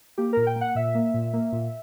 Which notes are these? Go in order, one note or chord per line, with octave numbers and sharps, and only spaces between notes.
A#3 G4
A#2 A#4
G5
A#3
F#5
A#2 E5
A#3
A#2
A#3
A#2